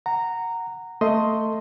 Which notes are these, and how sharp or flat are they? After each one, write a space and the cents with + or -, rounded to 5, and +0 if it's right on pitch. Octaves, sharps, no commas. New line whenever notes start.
F#5 +0 A#5 -10
A3 +15 D#5 +10 C6 +0